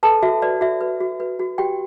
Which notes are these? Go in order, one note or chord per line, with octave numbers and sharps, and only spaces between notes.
A4 B4 A5
F#4 E5
B4 D5
F#4 E5
B4
F#4
B4
F#4
F#4 G4 G5